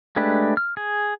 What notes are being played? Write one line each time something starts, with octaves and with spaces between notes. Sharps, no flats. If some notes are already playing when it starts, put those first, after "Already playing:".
G#3 A3 D4 G4 B4
F6
G#4